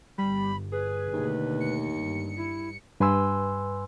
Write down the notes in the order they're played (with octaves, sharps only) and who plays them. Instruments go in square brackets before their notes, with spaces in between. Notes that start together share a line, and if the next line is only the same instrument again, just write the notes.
[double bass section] G1 [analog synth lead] G3 [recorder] B5
[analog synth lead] G#4 [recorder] B4
[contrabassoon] D#2 [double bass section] B2 D3 A3
[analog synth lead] C#7
[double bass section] G2
[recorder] E4
[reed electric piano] G2 B4 G#5 C6 E6